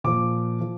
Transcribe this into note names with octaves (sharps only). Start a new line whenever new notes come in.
A#2 F3 D6
F3